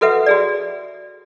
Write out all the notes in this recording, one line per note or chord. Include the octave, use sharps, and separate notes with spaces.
F#4 A4 B4 E5 F#5
F#4 G#4 D5